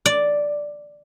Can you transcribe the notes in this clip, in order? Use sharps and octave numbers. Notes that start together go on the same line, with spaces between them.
D5